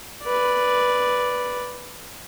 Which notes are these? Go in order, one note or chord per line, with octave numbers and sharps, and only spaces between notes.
B4 D5